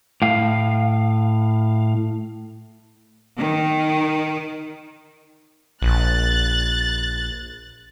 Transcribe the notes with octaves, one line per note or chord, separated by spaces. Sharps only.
A2 F5
D#3
A#1 F#6 A6